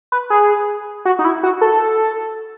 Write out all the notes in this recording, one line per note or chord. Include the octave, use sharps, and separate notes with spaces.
B4
G#4
F#4
D#4
E4
F#4
A4